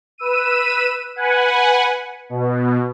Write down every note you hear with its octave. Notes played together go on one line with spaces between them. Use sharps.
B4 E6 D#7
B4 F#5 G#5
B2